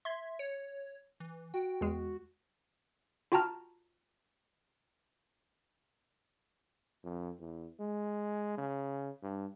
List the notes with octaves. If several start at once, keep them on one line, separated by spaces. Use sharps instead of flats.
E5 C6 G#6
C#5 C#7
E3
F#4 G5
E2 G#3
F4 F#4 G5 A5 A#5 F6
F2
E2
G#3
C#3
G2